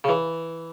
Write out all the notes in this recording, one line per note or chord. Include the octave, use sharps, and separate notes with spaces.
C#3
E3